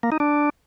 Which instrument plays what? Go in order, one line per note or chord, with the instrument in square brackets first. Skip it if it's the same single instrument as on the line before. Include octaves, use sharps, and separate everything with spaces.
[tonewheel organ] A#3
D#4
D4